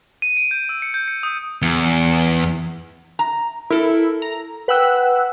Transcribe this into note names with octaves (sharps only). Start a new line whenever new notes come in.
D#7
D7
G6
E6
C#7
G6
C#7
D#6
E2
A#5
E4 A4 A#4
A#5
B4 F#5 G5 E6 F#6